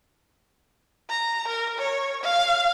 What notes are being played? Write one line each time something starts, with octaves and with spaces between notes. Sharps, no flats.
A#5
A#4
C#5
F5